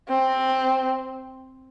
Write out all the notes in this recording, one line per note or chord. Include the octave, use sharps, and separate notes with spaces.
C4